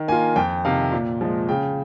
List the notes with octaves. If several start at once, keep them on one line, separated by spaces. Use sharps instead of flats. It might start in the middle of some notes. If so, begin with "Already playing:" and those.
Already playing: D#3
A#3 F4 G#5
F2 G5
C3 D#3 F5
A#2
F3 G#3
C#3 G5